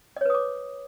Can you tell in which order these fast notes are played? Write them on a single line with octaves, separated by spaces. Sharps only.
D#5 C#5 B4 D#6 D6